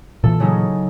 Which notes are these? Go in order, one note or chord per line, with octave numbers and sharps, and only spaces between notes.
A#2 E3 A4
C#3 F#3 D#4